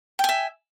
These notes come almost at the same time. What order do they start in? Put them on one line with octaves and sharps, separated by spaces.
G5 G#5 E5